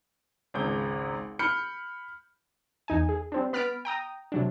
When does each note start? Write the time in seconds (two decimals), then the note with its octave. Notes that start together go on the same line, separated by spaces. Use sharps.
0.54 G#1 C#2 G6
1.39 B5 F6 G6 C#7
2.88 E2 D#4 G#5
3.09 G#4
3.32 G3 C4 D4
3.53 B3 B5 F6 A6 B6 D7
3.85 G5 A#5 D#6
4.32 C3 F#3 D4